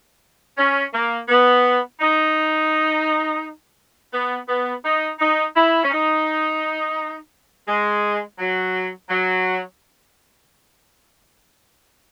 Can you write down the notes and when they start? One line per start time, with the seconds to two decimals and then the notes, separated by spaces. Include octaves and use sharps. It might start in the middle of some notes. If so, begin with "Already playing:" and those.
0.58 C#4
0.93 A#3
1.29 B3
2.00 D#4
4.13 B3
4.49 B3
4.84 D#4
5.20 D#4
5.55 E4
5.83 C#4
5.91 D#4
7.68 G#3
8.39 F#3
9.10 F#3